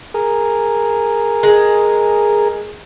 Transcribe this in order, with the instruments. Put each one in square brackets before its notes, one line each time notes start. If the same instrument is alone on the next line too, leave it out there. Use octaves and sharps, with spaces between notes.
[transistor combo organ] G#4 A#4
[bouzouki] G#3